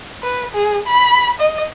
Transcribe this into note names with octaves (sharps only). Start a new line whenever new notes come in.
B4
G#4
B5
D#5